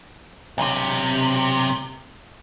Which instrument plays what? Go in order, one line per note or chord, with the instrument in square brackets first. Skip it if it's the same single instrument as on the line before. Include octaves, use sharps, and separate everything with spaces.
[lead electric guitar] B1 C3